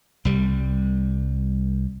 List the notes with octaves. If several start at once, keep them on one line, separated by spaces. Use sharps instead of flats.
C2 G3